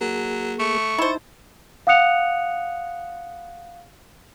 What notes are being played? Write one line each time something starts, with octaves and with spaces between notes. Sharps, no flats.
F#3 A#3 G#4
A3 C#6
D#4 E4 C5 A5
F5 F#5 D#6 F#6 C#7 F7